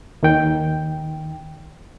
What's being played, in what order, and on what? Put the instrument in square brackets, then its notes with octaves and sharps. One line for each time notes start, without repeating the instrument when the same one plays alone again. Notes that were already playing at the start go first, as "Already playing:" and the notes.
[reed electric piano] D#2 D#3 G5 G6